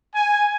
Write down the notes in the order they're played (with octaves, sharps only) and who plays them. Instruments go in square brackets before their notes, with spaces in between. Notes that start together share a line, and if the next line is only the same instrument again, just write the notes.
[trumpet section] G#5